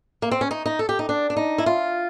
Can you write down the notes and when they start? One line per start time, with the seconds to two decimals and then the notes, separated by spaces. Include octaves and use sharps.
0.22 A#3
0.31 C4
0.41 C#4
0.51 D#4
0.66 D#4
0.79 A4
0.89 G4
0.99 D#4
1.09 D4
1.30 D4
1.36 D#4
1.58 E4
1.66 F4